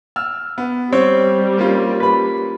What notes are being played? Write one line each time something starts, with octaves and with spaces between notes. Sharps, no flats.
E6 F6
B3
G3 C4 C#5
A#3 C#4 F4
B4 B5